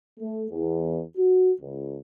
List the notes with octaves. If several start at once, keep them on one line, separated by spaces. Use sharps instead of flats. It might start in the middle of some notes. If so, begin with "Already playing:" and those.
A3
E2
F#4
C#2